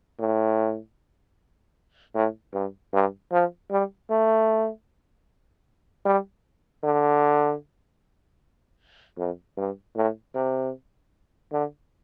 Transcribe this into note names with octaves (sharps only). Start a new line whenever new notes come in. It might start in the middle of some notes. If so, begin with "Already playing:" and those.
A2
A2
G2
G2
F3
G3
A3
G3
D3
F2
G2
A2
C3
D3